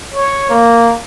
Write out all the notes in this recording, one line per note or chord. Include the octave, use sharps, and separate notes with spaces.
C#5
A#3